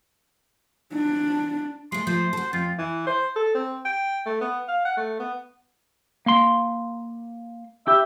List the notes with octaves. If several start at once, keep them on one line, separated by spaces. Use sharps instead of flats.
D4
G#3 A3 C6
F3 A3 C5
F#4 A4
F2 F4
E3
C5
A4
C4
G5
A3
B3
F5
F#5
A3
B3
A#3 C6
G4 E5